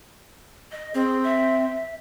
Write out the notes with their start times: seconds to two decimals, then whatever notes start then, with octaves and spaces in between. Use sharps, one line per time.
0.72 D#5
0.94 C4 G#4
1.24 E5